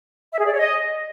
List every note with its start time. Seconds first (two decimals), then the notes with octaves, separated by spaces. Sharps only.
0.32 E5
0.38 G#4
0.45 D5
0.52 C#5
0.59 D#5